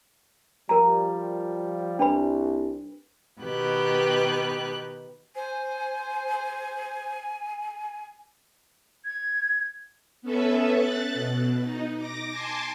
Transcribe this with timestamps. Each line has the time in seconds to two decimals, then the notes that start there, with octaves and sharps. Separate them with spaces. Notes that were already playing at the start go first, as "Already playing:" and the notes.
0.69 F3 G3 A#4 A#5
1.99 C2 D4 B4 B5
3.42 B2 D#3 B3 G4 B4 F#6
5.36 C5 G#5
9.05 G#6
10.22 B3 C#4 A4 B4 E5
10.72 F#6 A6
11.14 B2
11.61 D#4
11.98 D6 A#6
12.30 G#5 A5 C6 D6